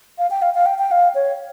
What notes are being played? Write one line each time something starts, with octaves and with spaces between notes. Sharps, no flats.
F5
G5
F5
F5
G5
G5
F5
C#5